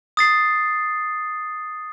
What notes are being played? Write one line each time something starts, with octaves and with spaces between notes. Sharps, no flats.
D#6 A6 C7